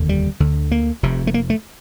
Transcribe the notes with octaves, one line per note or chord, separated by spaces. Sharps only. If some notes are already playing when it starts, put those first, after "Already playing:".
Already playing: F1 D#2 D3
G3
D2 D3
A#3
F1 F2 C3
A3
A#3
A3